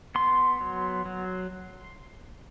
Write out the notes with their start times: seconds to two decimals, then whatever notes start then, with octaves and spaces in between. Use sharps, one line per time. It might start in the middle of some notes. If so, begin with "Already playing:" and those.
0.15 B3 C6
0.61 F#3
1.06 F#3